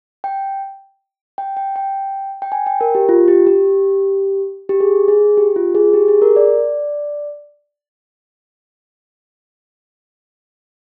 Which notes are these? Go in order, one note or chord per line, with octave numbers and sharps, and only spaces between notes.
G5
G5
G5
G5
G5
G#5
G5
A#4
G4
F4
G4
G4
G4
G#4
G#4
G4
F4
G#4
G4
G#4
A#4
D5